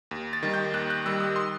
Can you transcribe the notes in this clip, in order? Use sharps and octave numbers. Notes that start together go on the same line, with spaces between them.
D#2
A6
D#3 G3
G6
D#2 F#6
F#6
D#3 G3 E6
D#6
C6